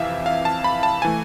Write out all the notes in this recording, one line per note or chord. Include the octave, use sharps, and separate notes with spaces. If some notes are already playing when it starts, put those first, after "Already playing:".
Already playing: F2 C3 E3 E5 F5
F5
A5
B5
A5
E3 A3 G#5